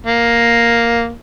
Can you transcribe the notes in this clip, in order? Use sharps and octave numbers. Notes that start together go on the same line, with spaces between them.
A#3